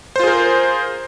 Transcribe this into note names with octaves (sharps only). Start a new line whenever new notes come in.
F4 G#4 A#4 C5